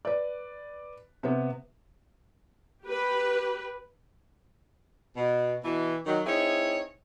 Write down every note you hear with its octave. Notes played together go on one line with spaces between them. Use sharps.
B4 D5
C3 B3
G4 B4
B2
B2 E3
D#3 F#3
C4 D#4 E4 G#4 C#5